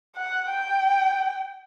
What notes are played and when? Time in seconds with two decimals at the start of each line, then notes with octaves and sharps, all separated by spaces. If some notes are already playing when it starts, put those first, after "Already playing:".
0.16 F#5
0.48 G5